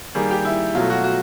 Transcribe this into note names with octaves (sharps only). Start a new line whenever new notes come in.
D#3 G3 A#3 G#4
G4
E4
B2 F#3 A3 F4
F#4
F#4